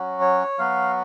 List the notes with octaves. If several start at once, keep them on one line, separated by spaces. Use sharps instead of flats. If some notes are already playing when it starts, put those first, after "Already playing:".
Already playing: F#3 C#4 F#4
C#5
F#3 B3 F#4 F5